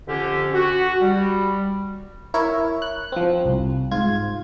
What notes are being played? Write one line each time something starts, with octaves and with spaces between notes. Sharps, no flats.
F2 D3 C#4 G4
F#4
G3
E4 A#4 C#5
F#6
F3 C4
C2
G#2 F4 G#6